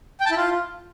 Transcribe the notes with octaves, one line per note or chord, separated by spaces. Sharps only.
G5
A5
E4
F4